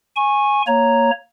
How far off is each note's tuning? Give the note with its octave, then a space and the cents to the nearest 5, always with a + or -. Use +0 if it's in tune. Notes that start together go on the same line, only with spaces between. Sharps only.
G#5 +0 C#6 -20
A#3 +0 C#5 +0 A#5 +0